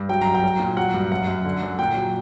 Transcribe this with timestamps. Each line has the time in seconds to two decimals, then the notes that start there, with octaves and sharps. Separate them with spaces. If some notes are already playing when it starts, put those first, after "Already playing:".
Already playing: G2
0.09 F#3 G5
0.21 F#2 A#5
0.35 G5
0.44 F#3
0.60 A#2
0.77 F#3 F#5
0.94 G2
1.12 F#2 F#5
1.28 F#2
1.45 D3
1.62 F#2
1.79 A#2 G5
1.97 F#3